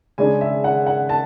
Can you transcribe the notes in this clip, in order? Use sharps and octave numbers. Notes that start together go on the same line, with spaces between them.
C#3 G#3 D4 G#5
E5
F#5
F#5
A5